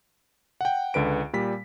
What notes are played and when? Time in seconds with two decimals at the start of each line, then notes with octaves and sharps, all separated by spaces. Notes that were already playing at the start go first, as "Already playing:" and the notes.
0.61 F#5 G5
0.94 C#2 D3 B4 D7
1.33 A#2 G3 B6